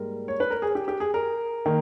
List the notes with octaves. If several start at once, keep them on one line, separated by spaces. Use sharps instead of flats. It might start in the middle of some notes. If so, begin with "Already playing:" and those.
Already playing: G#2 G3 A#3 A#4
C#5
B4
A#4
G#4
G4
G4
G#4
A#4
D#3 A#3